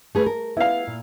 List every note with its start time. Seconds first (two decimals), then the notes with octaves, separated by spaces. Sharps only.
0.15 A3 G#4 B4
0.26 A#4
0.57 B3 E4 F5
0.87 A#2